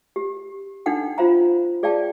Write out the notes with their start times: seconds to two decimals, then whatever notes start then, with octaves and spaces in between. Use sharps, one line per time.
0.16 G4
0.86 D4 D#4 A4 F#5 G5
1.18 F4 C5 F5 A#5
1.83 G#4 D5 F5 G5 A5